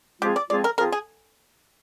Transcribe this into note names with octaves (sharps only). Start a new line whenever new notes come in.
F3 G#3 C4 F4 G4 G#4
D5
F3 G#3 C4 F4 G#4 D5
A#4
F3 C4 F4 G#4 A#4
G#4